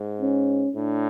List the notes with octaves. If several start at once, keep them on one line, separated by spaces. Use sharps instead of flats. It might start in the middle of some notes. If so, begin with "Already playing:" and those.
Already playing: G#2
C#4
A2 D4